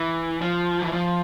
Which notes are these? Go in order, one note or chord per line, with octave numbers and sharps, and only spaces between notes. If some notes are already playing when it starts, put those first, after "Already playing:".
Already playing: E3
F3
E3
F3